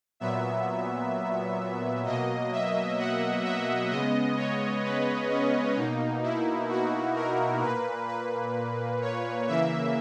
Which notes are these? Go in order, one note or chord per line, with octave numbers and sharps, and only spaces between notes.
A#2 F#3 B3 E5
B2 F#3 A#3 D#5
E5
F#5
E5
C#3 G#3 B3 D#5
C#5
B4
C#4
B2 A#3 D#4
E4
F#4
A#4
A#2 A#3 B4
B4
C#5
C#3 E3 A#3 E5